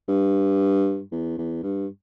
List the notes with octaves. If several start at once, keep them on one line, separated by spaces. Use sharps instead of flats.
G2
E2
E2
G2